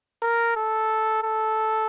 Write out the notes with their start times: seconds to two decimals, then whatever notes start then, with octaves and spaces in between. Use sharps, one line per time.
0.22 A#4
0.56 A4
1.23 A4